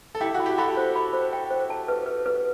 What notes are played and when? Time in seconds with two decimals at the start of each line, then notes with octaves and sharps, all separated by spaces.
0.15 A4
0.21 E4 G4 G5
0.34 F#4
0.40 B5
0.46 G4
0.58 F#4 A4 B5
0.77 C5
0.96 B5
1.13 C5
1.33 G5
1.50 C5
1.70 A5
1.88 B4
2.06 B4
2.26 B4